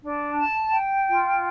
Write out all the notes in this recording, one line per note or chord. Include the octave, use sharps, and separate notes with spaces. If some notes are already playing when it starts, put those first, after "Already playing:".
D4
A5
G5
F4